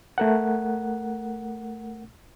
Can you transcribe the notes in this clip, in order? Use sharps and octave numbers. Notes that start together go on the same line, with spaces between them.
A3 A#4 F#5